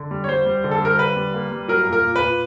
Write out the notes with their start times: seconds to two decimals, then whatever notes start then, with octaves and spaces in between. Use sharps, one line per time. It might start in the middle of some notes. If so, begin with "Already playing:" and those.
Already playing: D3
0.11 G3
0.24 C#5
0.28 G3 C5
0.46 G3
0.64 D3
0.71 A4
0.81 G3 A#4
0.99 D3 B4
1.16 G3
1.34 A#3
1.52 G3
1.68 F#3 A#4
1.87 A#2
1.93 A#4
2.04 A#2
2.16 B4
2.22 A#2